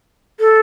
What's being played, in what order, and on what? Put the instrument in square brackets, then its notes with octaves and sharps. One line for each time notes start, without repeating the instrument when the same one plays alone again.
[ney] A4